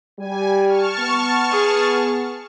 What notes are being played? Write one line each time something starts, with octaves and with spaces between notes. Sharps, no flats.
G3 G#5
A5 C#6 F6
B3
G#4